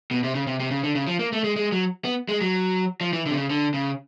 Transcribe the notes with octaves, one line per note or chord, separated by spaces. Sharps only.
B2
C3
C#3
C3
C3
C#3
D3
C#3
F3
A#3
A3
G#3
G#3
F#3
B3
G#3
F#3
F3
E3
D3
C3
C#3
D3
C#3